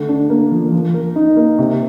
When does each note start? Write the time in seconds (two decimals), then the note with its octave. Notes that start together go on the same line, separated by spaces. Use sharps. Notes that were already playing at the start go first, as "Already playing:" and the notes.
Already playing: D3 A3
0.09 D4
0.30 A#3
0.52 F3
0.73 F3
0.94 A#4
1.16 D#4
1.37 A#3
1.58 C3